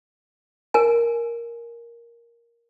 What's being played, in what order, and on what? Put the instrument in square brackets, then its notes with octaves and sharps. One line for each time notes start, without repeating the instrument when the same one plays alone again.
[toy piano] A#4 G#5